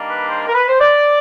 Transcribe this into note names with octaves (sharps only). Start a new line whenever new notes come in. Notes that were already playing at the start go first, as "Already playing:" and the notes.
Already playing: D#3 G3 A#3 D4
B4
C5
A#4
B4
C5
D5